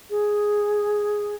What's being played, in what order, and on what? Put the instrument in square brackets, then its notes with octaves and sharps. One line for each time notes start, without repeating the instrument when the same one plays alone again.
[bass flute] G#4